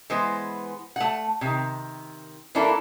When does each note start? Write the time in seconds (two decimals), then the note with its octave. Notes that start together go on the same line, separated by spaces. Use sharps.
0.10 E3 G#3 B3 C5
0.96 A3 F#5
1.41 C3 D#3
2.55 E3 A#3 D4 E4 A4 A#4